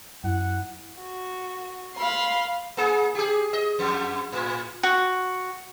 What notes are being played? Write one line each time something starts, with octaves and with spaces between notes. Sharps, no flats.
F#2 E4 F#5
F#4
F5 B5 C6
A#3 G#4
G4 G#4
D#5
F2
A2
F#4